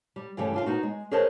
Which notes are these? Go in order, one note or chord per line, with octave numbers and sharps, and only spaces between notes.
G3
G2 C#3 E3 G3 A3
D4 F4 F5
B3 D#4 F#4
G#3
G#4 A#4 C5 C#5 D#5 A5